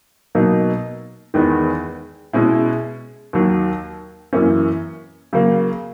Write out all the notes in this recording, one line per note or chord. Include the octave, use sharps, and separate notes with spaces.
B2 F#3 A#3 D#4
E2 D#3 G#3 B3
B2 G#3 C#4 E4
D#2 D#3 F#3
F#2 E3 A#3 C#4
C#3 F#3 A#3